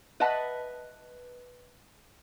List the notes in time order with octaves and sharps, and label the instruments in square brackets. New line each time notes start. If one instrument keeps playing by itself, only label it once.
[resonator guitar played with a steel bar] B4 D#5 E5 F#5 A5